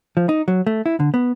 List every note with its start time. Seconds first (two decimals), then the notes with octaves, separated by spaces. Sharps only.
0.17 F3
0.29 D#4
0.48 F#3
0.67 A3
0.86 E4
1.00 D3
1.14 B3